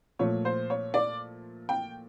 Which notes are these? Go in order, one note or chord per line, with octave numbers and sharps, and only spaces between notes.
A#2 F3 A3 C#5
C5
C#5
D5
G5